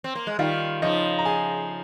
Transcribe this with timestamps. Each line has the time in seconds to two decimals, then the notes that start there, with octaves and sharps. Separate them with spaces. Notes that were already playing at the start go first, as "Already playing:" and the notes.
0.04 C4
0.15 A#3
0.27 G#3
0.39 D#3 G3 F4 F5
0.82 C#3 F3 D#4 D#5
1.19 A#5
1.25 G#4 G#5